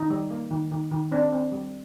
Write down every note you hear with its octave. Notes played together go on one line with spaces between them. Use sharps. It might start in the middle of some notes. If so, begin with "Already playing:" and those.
Already playing: D#3 D#4
G3
A#3
D#3
D#3
D#3
C4 D4
C4
G3